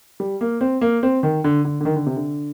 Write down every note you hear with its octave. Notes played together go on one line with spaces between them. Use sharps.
G3
A#3
C4
A#3
C4
D#3
D3
D3
D3
D#3
D3
C3
D3